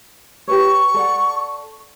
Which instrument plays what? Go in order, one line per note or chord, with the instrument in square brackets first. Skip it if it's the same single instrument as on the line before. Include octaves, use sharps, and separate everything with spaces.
[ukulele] G4 B4 C#5 [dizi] C#6
[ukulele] A4 D5 F#5